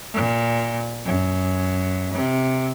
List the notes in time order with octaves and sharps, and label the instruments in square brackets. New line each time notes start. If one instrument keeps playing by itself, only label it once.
[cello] A#2
F#2
C3